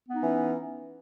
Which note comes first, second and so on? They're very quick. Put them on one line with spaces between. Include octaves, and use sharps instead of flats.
B3 D#4 C#4 E3